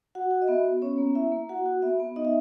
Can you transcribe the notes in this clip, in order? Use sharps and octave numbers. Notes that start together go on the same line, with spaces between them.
F#4 F#5
F#4
D#5
B3 E5
B3
C#4 C#5
A#3
E4 E5
A#3
F#4 F#5
F#4
B3 E5
B3
D#4 D#5
E5